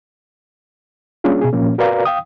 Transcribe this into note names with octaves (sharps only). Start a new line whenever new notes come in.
G3 A#3 C#4 D4 F4 G#4
B2 G#4
A#2 F3 A#3 C#4
F#4 A#4 B4 D5 F5 A#5
F5 G5 D#6